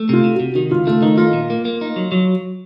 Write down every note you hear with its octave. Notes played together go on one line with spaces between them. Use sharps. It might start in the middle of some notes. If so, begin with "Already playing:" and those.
Already playing: A3
C3 F4
C3
F#4
C3
D#3 F#4
C#2 F4
A3 F4
D#3 D#4
D#4 F4
A#2
A#3
A#3
D#4
F#3
F#3